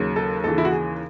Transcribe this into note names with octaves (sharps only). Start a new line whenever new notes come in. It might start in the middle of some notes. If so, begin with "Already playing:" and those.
Already playing: D#2 C#3 F#3
A4
D#2 C#3 E3 A4
E4
F#4
G#4